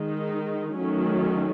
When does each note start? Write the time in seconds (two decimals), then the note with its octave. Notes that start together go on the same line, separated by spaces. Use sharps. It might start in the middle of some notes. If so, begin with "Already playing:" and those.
Already playing: D#3 G#3 D#4
0.76 D#3 F#3 A3 C#4